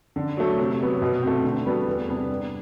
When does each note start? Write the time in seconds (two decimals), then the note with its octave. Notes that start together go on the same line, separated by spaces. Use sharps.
0.16 D3
0.37 F#3 A3
0.58 C3
0.80 F#3 B3
1.02 B2
1.23 A3 C4
1.44 D3
1.65 G3 B3 F#4 A4
1.87 E2
2.08 C3 G3 B3 D4
2.30 G2